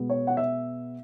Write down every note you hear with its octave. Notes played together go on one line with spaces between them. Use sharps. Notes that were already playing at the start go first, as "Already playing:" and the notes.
Already playing: B2 G#3 B3
C#5
F#5
E5